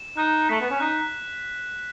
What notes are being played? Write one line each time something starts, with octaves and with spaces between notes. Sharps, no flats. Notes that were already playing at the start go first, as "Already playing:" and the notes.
Already playing: E7
D#4 F#6
A3 B6
B3
C#4
D#4 F#6